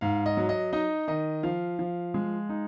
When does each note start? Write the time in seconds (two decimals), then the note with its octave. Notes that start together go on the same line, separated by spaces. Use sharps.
0.01 G#2 F5
0.26 D#5
0.37 F#3
0.49 D#5
0.73 D#4 D#5
1.08 D#3 D#5
1.43 F3 F5
1.79 F3
2.14 G#3
2.49 D#4